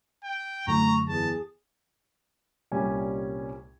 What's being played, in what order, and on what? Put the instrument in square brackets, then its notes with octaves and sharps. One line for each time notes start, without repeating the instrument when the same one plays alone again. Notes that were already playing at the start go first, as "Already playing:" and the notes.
[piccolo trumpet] G5
[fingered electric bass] F#2 D3 F#3 [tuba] A3 [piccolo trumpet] A#5 [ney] C#6
[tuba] E2 [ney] G#4 [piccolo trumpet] A5
[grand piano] C2 A#2 G3 C#4 G#5